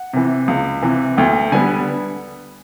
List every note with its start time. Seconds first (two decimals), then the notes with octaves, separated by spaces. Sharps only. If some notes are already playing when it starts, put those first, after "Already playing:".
Already playing: F#5
0.13 C3 E3
0.48 C#2
0.82 C3 E3
1.17 D2 G5
1.52 D3 G3 B3 G#5